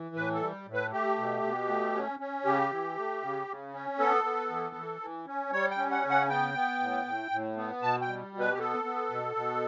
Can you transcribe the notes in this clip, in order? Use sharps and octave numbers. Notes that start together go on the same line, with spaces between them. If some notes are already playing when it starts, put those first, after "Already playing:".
Already playing: E3
A2 B4
A4
G3
A2
B4
A3 G4
B2
B2
A3
C#4
C#4
C#3 G4
E3
A3
C#3
C#3
C#4
B3 A4
B3
E3
E3
E3
C#4
G3 C#5
G5
C#4
F#5
C#3
F#5
B3 G5
B3
A2
A2
A2
B3
B2 A5
G5
G3
B2
B4
G4
B3 A4
B3
B2
B2